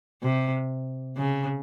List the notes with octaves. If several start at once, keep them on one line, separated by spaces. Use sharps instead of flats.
C3
C#3